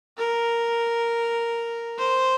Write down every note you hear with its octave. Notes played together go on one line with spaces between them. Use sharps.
A#4
C5